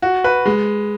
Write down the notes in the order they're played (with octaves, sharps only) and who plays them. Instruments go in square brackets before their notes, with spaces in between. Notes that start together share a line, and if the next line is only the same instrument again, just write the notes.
[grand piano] F#4
B4
G#3